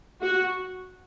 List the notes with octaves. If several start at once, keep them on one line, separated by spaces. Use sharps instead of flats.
F#4